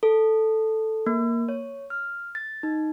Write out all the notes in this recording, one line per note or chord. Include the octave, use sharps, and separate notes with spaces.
A4
A#3
C#5
F6
A6
D#4